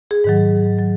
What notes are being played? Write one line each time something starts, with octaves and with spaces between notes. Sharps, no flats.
G#4
G#2 D#3 F#3
F#3